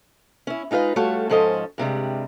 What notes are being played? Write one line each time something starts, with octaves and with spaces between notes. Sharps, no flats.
C#4 E4
G#3 D#4 F4 B4 F5
G3 A3 F4 F#4 A4 C#5
G#2 F3 C#4 A4 D#5
G2 C3 G3 G#3